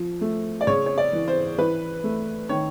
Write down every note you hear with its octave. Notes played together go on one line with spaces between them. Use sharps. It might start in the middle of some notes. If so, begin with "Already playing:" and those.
Already playing: F3
A3
D5
C#3 C#5
C#5
D5
E3
C5
E3 B4
A3
D#3 C#5